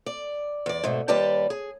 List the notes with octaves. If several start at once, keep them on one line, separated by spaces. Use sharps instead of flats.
D5
E2 D5
G#2 B2 A3
D#2 G3 G4 B4 D5 A5
G#4